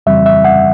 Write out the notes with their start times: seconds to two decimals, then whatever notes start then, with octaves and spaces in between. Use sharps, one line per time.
0.06 F2 C#3 E3 G3 C4 E5
0.26 E5
0.45 F#5